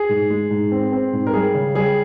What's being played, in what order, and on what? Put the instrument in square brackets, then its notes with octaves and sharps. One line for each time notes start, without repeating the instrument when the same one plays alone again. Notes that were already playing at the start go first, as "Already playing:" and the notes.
Already playing: [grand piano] G#4
G#2
G#3
G#2
C4
C4
G#2
A#4
G3 G#4
C#3
G3 G#4